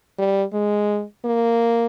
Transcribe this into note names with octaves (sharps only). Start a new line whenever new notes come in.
G3
G#3
A#3